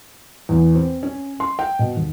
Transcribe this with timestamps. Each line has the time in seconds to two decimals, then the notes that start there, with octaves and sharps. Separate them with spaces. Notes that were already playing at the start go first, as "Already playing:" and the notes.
0.49 E2
0.75 C4
1.03 C#4
1.40 C6
1.59 G5
1.79 B2
1.97 D#2